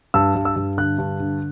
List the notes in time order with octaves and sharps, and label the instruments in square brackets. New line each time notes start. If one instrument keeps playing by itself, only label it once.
[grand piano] G2 E6
G2
E6
G2
D3 F#6
G2
D3